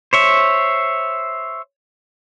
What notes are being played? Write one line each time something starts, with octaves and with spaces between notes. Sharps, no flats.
C5 C#5 E5